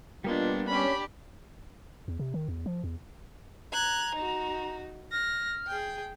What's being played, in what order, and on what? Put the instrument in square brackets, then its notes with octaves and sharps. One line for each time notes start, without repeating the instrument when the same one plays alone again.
[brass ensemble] B2 F4 [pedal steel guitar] G3 B3 C6 [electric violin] A#3 D4
[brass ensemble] C#4 [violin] D4 G4 [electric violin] B5
[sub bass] E2
C3
D#3
E2
F3
E2
[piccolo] A#5 [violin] F#6 G#6
[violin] D#4 F#4
[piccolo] F6 [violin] A#6
[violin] G#4 G5